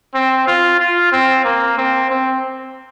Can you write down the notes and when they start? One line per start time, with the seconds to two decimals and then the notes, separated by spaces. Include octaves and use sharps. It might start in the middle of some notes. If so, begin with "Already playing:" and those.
0.15 C4
0.47 F4
0.79 F4
1.12 C4
1.45 A#3
1.78 C4
2.10 C4